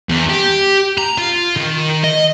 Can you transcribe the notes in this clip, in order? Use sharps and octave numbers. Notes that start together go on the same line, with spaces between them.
E2
G4
A#5
F4
D#3
D#5